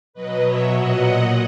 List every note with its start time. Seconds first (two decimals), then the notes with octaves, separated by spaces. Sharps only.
0.14 B2 F#3 B4 D#5
0.43 C#5 E5
0.73 A#2 F#3 D#5 F#5